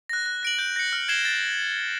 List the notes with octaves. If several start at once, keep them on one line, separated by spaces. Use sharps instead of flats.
F#6 A#6
F#6
A#6 D7 F#7
G6
A#6 C#7
F6
G#6 C7 E7 G7
A6